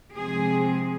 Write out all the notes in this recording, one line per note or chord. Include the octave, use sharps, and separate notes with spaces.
C3 F3 G#3 C4 G#4